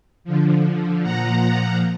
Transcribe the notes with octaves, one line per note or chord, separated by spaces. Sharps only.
D3 F3
A#2 F3 F#5 A#5